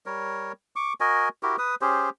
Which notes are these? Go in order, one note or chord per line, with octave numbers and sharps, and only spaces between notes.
G3 A#4 C#5
C#6 D6
F#4 A#4 D#5 G#5
E4 F#4 G4 A#4
B4 D#6
C#4 G4 G#4 C5